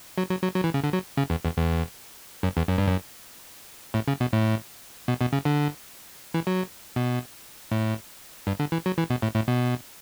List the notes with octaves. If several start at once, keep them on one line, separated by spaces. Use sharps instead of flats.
F#3
F#3
F#3
F#3
E3
C#3
D3
F#3
C#3
E2
E2
E2
F#2
E2
F#2
G2
F#2
A2
C#3
B2
A2
B2
B2
C#3
D3
E3
F#3
B2
A2
G2
D3
E3
F#3
E3
B2
A2
A2
B2